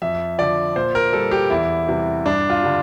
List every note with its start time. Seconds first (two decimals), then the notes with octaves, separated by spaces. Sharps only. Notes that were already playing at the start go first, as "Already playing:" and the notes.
0.02 F2 E5
0.38 D3 F3 D5
0.76 A#2 C5
0.95 A#4
1.13 G3 A4
1.31 G4
1.50 E2 E4
1.88 C3 E3 G3
2.26 G2 D4
2.50 F4
2.62 D3 G3